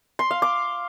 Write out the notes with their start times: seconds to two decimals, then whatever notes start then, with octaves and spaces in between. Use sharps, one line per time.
0.19 C6
0.31 F5
0.42 D6